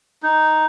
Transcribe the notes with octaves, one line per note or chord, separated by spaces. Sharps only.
D#4